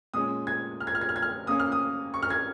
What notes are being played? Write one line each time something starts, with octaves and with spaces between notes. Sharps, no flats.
A#2 G#3 C#4 D#6
G#6
F6
G#6
F6
G#6
F6
G#6
F6
C#3 A#3 C#4 D#6
F6
D#6
C#6
F6
G#6